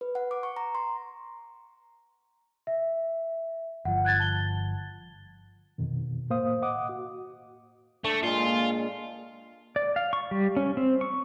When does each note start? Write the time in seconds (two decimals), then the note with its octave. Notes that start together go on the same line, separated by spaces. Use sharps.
0.01 B4
0.15 F#5
0.31 D6
0.43 C#6
0.56 A#5
0.75 C6
2.67 E5
3.85 G1 F3 F#5
4.05 F#6 G#6 A6
4.20 A5 G7
5.78 F2 B2 D#3
6.30 A2 A#3 C5 F5 D#6
6.62 D#5 F#5 D6 D#6
6.89 F#4
8.04 A3 D4
8.23 A#2 G#3 F4
9.76 D5
9.96 F5
10.13 C#6
10.31 G3
10.57 C#4
10.77 C4
11.01 C#6